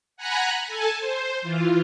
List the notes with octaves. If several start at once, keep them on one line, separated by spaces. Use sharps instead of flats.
F#5 G#5 A#5 B5 F#6
A4 G#5 A5
C5
E3 F4